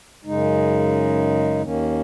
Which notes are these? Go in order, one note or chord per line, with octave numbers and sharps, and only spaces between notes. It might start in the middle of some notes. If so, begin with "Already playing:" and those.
F#2 C#3 G#3 D#4
D#2 D#3 A#3 C#4